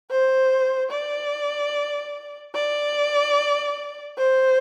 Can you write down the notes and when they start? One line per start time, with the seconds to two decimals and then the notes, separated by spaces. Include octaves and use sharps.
0.10 C5
0.92 D5
2.55 D5
4.17 C5